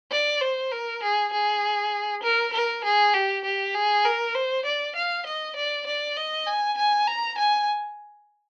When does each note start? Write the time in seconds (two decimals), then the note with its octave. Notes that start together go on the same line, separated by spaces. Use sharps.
0.12 D5
0.41 C5
0.72 A#4
1.02 G#4
1.33 G#4
2.23 A#4
2.53 A#4
2.84 G#4
3.14 G4
3.44 G4
3.74 G#4
4.05 A#4
4.35 C5
4.65 D5
4.96 F5
5.26 D#5
5.56 D5
5.86 D5
6.17 D#5
6.46 G#5
6.78 G#5
7.07 A#5
7.38 G#5